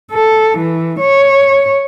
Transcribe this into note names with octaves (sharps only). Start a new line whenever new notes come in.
A4
E3
C#5